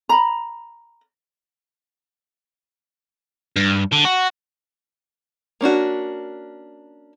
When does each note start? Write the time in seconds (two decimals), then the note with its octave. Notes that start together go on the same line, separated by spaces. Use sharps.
0.09 A#5 B5
3.56 G2
3.93 D3
4.05 F#4
5.61 A#3 C#4 D4 F#4